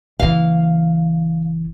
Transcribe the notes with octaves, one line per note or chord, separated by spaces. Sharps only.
F#1 E3 F5